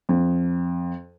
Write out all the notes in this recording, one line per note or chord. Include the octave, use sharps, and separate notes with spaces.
F2